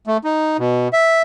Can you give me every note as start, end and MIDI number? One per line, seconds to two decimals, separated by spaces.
0.07 0.17 57
0.24 0.57 63
0.59 0.88 47
0.93 1.22 76